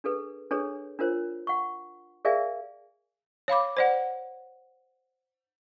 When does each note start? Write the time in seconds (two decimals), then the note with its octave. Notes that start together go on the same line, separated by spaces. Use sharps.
0.04 D4 G#4 A4 B4
0.51 D4 G#4 A4 B4 C#5
0.99 D4 F4 A#4 C5 C#5
1.47 F#5 C#6
2.25 G#4 A#4 D5 E5 F5 G#5
3.48 C#5 F5 B5 D6
3.77 C5 D5 F#5